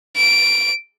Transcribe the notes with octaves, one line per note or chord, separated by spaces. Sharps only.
D7